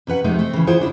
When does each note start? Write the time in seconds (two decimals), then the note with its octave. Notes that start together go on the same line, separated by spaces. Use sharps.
0.07 C3 C#4 B4 F#5
0.24 F2 C3 G#3 A3 D#4
0.39 A3 C4
0.53 C#3 E3
0.67 E4 F4 G#4 C5 F#5
0.78 G2 C#3 D4 E4